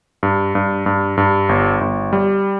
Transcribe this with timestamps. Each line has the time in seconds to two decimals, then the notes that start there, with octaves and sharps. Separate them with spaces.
0.23 G2
0.55 G2
0.86 G2
1.17 G2
1.49 G1
1.81 G1
2.13 G3